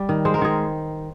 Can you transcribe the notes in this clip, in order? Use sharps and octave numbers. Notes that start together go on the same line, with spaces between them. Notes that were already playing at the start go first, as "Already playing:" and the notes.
Already playing: G3
D#3
G#3 C5
A#4
D#3 G#4